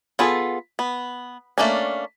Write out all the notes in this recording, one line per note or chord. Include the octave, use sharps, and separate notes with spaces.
B3 F4 G#4 A4
B3
A3 A#3 C#4 D4